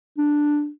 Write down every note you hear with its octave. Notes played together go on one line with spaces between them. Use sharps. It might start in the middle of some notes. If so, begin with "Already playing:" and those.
D4